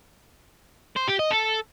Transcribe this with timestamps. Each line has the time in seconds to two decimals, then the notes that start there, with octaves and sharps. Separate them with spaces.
0.96 C5
1.08 G4
1.19 D#5
1.31 A4